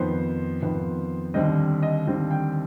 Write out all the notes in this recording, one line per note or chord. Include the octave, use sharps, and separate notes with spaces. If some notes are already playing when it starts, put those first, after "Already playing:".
Already playing: F2 D#3 B3 C5
F2 D#3 B3
D#2 D3 G3 C4 D#5
D#5
D#2 D3 G3 C4
G5